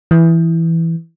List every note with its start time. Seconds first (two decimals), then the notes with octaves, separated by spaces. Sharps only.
0.11 E3